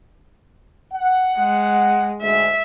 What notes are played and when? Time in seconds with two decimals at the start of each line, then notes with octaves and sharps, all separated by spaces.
0.93 F#5
1.38 G#3
2.22 D2 G#2 G#3 E5